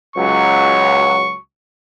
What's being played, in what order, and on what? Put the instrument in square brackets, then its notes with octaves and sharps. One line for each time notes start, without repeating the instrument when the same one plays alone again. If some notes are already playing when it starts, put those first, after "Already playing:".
[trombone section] C#2 F#3 [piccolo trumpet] C#6